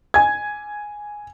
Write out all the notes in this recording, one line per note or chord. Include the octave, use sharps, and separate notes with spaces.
G#5 G#6